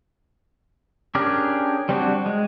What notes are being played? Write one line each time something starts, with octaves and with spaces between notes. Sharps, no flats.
C#4 D4 G4 G#4 A#4
G3 C4 D4 F#4
G#3